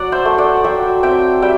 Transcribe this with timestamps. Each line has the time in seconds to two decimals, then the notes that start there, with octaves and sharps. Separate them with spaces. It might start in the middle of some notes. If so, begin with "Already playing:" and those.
Already playing: F#3 D5 F#5
0.12 C5 E5
0.25 A3
0.38 D5 F#5
0.64 F#3 E5 G5
1.03 C4 E5 G5
1.42 G3 E5 G5